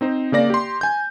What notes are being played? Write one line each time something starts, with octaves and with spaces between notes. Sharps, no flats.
C4 D#4 C5
C#3 A#3 D5 A#6
G4 C6
G#5 G6